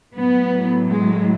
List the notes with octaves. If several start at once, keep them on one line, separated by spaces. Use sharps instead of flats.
A2 F#3 B3
G#3